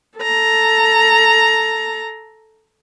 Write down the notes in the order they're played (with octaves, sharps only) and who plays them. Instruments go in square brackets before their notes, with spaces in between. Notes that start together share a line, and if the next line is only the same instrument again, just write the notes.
[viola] A4 A#5